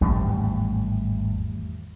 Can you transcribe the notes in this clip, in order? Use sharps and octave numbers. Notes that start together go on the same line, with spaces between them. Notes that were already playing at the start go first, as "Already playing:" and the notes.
G#1 E2 A2 G3